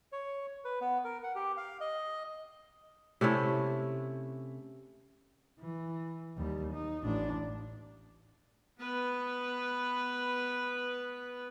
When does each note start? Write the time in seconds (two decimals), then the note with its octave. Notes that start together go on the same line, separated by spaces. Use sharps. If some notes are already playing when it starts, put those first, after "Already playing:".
0.12 C#5
0.65 B4
0.81 B3
1.04 A#4
1.23 F#5
1.35 G4
1.57 F5
1.81 D#5
3.21 C3 A3 C#4 E4
5.60 E3
6.37 D#2 G3
6.73 D#4
7.04 A1 D4
8.79 B3 B4